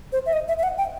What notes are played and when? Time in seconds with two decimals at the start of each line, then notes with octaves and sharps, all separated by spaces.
0.12 C5
0.26 E5
0.33 D#5
0.48 E5
0.58 E5
0.63 F#5
0.78 G5